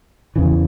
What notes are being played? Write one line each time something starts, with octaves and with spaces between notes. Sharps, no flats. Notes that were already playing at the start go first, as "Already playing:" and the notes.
E2 C#3 E3